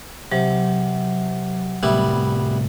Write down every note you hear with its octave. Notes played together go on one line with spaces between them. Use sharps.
C3 F#3
A2 C3 G3 A3 B3 E4